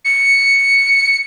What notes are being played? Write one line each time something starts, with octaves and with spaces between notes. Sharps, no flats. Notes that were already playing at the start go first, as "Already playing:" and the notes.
C#7